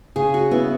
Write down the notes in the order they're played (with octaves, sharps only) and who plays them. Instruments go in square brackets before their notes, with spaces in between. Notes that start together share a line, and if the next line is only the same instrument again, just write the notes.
[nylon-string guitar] C#3 [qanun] G#4
[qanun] F#4
[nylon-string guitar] B3 [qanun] E4